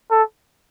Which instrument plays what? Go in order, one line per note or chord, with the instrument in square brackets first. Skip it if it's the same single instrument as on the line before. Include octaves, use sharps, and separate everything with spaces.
[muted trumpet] A4